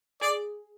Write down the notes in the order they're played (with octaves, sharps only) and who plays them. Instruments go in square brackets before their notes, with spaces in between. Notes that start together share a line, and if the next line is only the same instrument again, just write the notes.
[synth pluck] G#4 [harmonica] D5